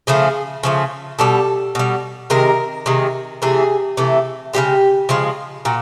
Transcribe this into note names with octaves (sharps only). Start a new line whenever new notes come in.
C#3 F3 A3 G#4
C#3 F3 A3
B2 G3 A4
B2 G3
C3 D#3 G#3 A#4
C3 D#3 G#3
C3 E3 A3 G#4
C3 E3 A3
C#3 F3 G#3 G4
C#3 F3 G#3
A#2 F#4